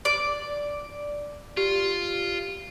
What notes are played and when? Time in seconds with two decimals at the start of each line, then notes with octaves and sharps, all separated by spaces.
0.05 D5
1.57 F4 G4